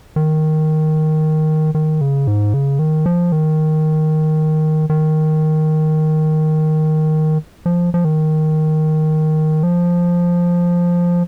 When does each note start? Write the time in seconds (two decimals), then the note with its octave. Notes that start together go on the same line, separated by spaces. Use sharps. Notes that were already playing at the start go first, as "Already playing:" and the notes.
0.16 D#3
1.75 D#3
2.01 C#3
2.27 G#2
2.54 C#3
2.79 D#3
3.06 F3
3.32 D#3
4.90 D#3
7.66 F3
7.94 F3
8.05 D#3
9.63 F3